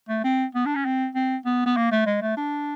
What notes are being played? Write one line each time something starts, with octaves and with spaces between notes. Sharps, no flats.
A3
C4
B3
D4
C#4
C4
C4
B3
B3
A#3
A3
G#3
A3
D4